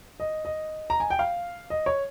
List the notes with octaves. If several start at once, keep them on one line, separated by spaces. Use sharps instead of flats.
D#5
D#5
A#5
G#5
G5
F5
D#5
C#5